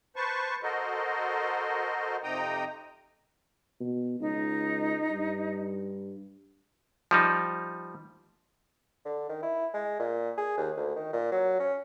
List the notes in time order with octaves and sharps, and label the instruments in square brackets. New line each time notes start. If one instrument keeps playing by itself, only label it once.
[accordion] B4 C5 A5 C#6
F#4 A4 A#4 C5 D#5
F2 C3 D#4 G5 A#5 D#6
[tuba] B2
[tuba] C#2 [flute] D#4
[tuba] G2
[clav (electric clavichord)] F3 G3 D#4
[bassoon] D3
D#3
E4
G#3
A#2
G#4
D#2
D2
D#3
A#2
F#3
C#4